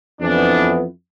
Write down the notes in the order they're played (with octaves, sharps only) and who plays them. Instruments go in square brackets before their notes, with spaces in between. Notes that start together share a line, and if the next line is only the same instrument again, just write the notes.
[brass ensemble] F2 E3 B3 D4